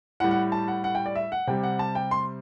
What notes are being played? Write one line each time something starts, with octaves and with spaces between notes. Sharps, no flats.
A2 G3 F#5
F#5
A5
F#5
F#5
G5
D5
E5
F#5
C3 G3 G5
F#5
A5
G5
C6